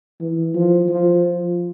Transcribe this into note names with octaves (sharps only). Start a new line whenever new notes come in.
E3
F3
F3